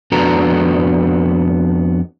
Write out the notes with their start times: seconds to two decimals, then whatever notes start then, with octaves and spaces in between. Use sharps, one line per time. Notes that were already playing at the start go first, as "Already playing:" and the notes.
0.12 F2 B3 D4 F#4 A4 A#5